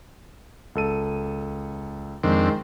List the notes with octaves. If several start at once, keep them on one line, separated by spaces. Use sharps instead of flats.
C#2 A4 D#7
F2 D#3 G#3 C4 D4